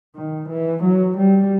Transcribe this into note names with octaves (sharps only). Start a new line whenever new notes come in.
D#3
E3
F#3
G3